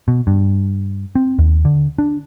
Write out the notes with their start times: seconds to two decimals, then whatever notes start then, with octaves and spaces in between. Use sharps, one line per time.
0.08 B2
0.27 G2
1.15 C4
1.39 D#2
1.65 D3
1.98 D4